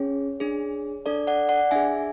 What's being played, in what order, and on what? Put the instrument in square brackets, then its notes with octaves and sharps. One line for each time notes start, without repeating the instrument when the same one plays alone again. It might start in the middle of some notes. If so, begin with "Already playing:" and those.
Already playing: [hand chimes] C#4 G#4 C#5
D4 G#4
D4 A4 D5
D5 F#5
D5 F#5
D4 G#4 E5 G#5